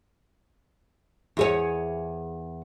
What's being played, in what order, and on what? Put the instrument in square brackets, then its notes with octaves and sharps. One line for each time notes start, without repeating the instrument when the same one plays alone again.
[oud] E2 G#4 C#5